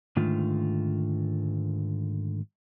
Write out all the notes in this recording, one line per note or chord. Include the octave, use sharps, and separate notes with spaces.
G#2 D3 D#3 A3 F4